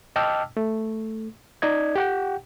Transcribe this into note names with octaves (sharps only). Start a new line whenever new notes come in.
D#5 G5 A5 D6 E6 F6
A3
D#4 D5 D#5 G#6
G4 F#5 G5